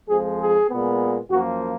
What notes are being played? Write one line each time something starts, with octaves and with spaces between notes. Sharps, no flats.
F2 F3 G#3 G#4
G#4
A#2 G#3 B3
F#2 F3 A#3 F#4